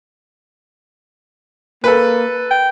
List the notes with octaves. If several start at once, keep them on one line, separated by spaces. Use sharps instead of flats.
A#3 A4 B4
G5